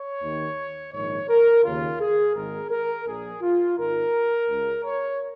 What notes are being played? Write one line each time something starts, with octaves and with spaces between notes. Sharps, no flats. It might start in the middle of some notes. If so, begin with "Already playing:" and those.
Already playing: C#5
D#2 D#3
A#1 G#2 D#3 C#5
A#4
D#2 C#3 F4
G#4
G#1 G#2 D#3 A#4
A#4
A#1 A#2 G#4
F4
G#1 G#2 D#3 A#4
C#2 C#3
C#5